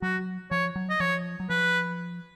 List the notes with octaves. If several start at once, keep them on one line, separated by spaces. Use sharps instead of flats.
F#3 F#4
F3 C#5
F#3
D#5
F3 C#5
F#3
F3 B4